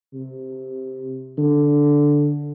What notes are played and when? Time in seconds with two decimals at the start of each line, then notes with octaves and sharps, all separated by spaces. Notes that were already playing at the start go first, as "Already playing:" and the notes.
0.13 C3
1.38 D3